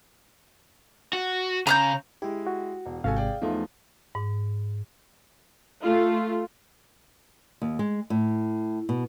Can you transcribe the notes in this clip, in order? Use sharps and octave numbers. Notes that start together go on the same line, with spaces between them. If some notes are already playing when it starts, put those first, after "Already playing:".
F#4
C#3 A#5 F#6 G6
G#3 E4 G4
F#4
E1
G#1 G#2 C3 F#4 A4 F5 G#5
G#4 D5 G5
E2 F3 A3 D#4 F4
G#2
A3 F4
D#2
G#3
A2
B2